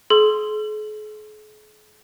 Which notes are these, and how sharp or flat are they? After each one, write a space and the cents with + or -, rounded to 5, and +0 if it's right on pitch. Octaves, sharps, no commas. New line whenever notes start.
G#4 +45 C6 +0 E6 +40